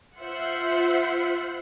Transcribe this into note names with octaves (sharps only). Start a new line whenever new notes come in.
F4 C5 E5 F#5 C6